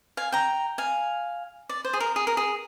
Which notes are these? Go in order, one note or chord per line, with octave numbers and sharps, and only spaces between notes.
F5 G#5
G5 A#5
F5 G#5
D5
C5
G#4
A#4
G#4
A#4
G#4